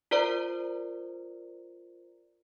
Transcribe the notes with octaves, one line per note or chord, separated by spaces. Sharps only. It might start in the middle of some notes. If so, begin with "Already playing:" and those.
F4 A#4 C5 D5 A#5